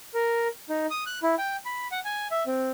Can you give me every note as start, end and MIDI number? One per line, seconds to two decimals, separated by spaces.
0.14 0.48 70
0.69 0.86 63
0.90 1.04 87
1.06 1.19 90
1.23 1.35 64
1.38 1.56 79
1.65 1.87 83
1.91 2.00 78
2.05 2.27 80
2.31 2.43 76
2.47 2.72 60